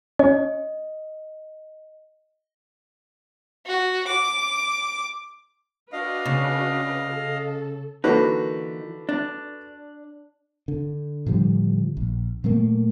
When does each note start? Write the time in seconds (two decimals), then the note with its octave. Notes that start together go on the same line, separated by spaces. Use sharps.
0.19 C#4 D#5
3.67 F#4
4.08 D6
5.92 D4 F#4 B4 D#5 F5
6.25 C#3
7.07 A4
8.04 D3 E3 A#3 D#4 F#4 B4
9.09 D4
10.68 D3
11.26 A2 D3 F3 G3
11.97 A#1
12.44 A#2 F#3 A3 A#3